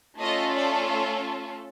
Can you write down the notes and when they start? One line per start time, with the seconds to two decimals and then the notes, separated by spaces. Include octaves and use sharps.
0.20 A3 C#4 F4 A4 D#5
0.53 D5